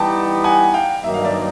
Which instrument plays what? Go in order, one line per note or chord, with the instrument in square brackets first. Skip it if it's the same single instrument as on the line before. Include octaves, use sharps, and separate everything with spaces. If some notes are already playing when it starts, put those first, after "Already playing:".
Already playing: [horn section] E3 G3 B3 D#4 G4 [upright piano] G5 A5
[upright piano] F#5 G#5
F5 G5
[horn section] G2 D#3 F#3 A#3 D#4 [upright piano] E5
[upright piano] F5
D5 E5